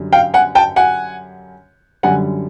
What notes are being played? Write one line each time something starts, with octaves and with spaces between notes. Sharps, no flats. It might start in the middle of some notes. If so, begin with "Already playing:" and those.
Already playing: F#2 D3 G3
F5 G5
F#5 G#5
G5 A5
F#5 G#5
F#2 D3 G3 F#5 G#5